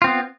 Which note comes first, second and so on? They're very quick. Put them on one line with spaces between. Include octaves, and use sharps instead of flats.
F4 C4 B3